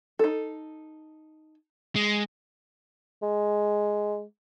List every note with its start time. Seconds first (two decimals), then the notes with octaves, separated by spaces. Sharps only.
0.19 D#4 A4
1.96 G#3
3.22 G#3